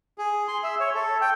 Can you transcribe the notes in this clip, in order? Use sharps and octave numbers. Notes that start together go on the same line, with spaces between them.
G#4
C6
E5
C#5
A4
G5